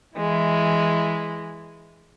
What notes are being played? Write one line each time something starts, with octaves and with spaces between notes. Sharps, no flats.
E3 G#3 E4